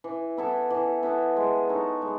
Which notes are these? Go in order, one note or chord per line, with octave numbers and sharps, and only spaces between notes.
E3
B3 E4 A4
E3
B3 E4 A4
G#3
D#4 A4 C#5
G#3